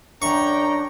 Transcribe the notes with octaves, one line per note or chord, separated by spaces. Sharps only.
F#2 D4 G5 A#5 C#6